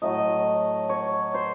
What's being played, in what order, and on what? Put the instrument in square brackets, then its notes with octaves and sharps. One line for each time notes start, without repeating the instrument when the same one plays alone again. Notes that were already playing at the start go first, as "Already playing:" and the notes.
[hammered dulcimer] A2 F#3 A3 D#5
C#5
C5